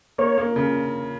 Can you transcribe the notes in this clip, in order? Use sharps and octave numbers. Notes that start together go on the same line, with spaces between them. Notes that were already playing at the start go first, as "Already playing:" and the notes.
A#3 C#5
A#3
C#3